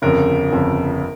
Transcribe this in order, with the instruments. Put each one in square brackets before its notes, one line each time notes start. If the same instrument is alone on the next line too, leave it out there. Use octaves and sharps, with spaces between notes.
[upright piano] G1 F2 C#3 [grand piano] A#4
[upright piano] G1 F2 C#3